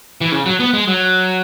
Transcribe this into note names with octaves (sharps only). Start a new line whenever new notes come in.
E3
C#3
F#3
B3
G#3
F#3